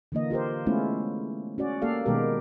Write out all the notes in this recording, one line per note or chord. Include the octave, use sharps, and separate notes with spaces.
D3 E3 A#3 D#5
F4 G4 A#4 C5
G#3 A3 B3 C#4 E4 F4
C#4 F#4 D5
A#3 G4 A4 D5 F5
B2 D#3 G#3 B3 G4 A#4